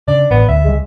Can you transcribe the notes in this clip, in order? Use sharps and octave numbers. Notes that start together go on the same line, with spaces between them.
C#3 D4 D5
A1 B3
D2 E5
C#2 G3 G#3